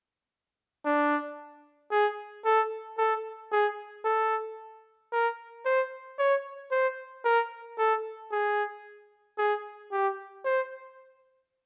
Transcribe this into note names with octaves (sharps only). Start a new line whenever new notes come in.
D4
G#4
A4
A4
G#4
A4
A#4
C5
C#5
C5
A#4
A4
G#4
G#4
G4
C5